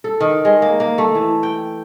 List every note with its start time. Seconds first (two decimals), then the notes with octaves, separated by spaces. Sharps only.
0.04 A4
0.21 D#3
0.45 G#3
0.62 A#3
0.80 A#3
0.98 A3
1.15 E3
1.43 G5